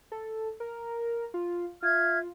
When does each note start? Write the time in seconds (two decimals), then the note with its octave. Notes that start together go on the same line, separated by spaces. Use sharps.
0.12 A4
0.60 A#4
1.34 F4
1.83 F4 E5 F6 G#6